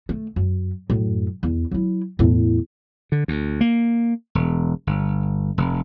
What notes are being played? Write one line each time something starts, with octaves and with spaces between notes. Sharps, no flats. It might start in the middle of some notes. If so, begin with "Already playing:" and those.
A3
F#2
F#2 A2
E2
F#3 E4
E2 A2
D3
D2
A#3
E1
G1
F1